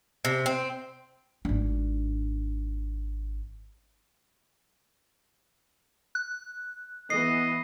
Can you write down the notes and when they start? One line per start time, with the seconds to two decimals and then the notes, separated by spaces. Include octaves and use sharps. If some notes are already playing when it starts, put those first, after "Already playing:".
0.25 C3
0.46 C4
1.45 G#1 D4
6.15 F#6
7.10 E3 B3 D#5 C7